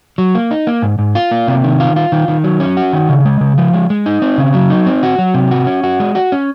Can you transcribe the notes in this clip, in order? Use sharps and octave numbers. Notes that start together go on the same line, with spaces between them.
F#3
A#3
D#4
A#3
G#2
G#2
F4
A#3
C3
D#3
F4
F4
D#3
D#3
F#3
C#4
F#4
D#3
C#3
G#3
C#3
F3
G#3
G#3
D#4
C4
C#3
F#3
D#4
C4
F#4
F#3
C3
F#4
C#4
F#4
G#3
F#4
C#4